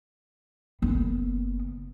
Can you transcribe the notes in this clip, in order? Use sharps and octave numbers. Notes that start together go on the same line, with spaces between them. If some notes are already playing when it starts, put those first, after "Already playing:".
F#1 B3